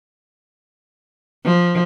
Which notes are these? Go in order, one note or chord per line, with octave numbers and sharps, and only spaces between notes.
F3